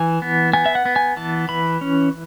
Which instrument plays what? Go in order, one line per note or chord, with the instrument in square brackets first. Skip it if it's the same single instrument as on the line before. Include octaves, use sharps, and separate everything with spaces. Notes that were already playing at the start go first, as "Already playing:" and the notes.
Already playing: [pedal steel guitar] E3 G#5
B3
B3 G#5
E5
F#5
B3
G#5
E3 A5
E3 B5
C#4